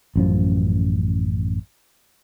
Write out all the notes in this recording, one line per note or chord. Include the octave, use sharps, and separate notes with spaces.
A1 F#2 F3